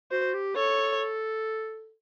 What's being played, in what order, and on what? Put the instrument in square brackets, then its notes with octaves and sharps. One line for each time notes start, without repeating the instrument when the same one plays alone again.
[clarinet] F#4 [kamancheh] C5
[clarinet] G4
[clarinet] A4 [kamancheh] C#5